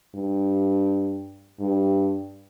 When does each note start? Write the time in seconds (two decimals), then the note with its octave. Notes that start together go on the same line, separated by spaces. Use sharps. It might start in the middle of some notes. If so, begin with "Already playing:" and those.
0.15 G2
1.60 G2